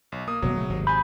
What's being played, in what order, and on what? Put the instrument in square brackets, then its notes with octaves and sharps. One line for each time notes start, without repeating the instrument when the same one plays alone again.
[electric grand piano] B1
A#3 D#6
[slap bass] D#1 B2 A#3 [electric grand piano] F#3
[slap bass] C#3 A3
G#1 C3
[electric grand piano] G#5 G6 [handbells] B5